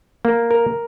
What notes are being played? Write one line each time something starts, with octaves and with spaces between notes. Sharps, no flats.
A#3
A#4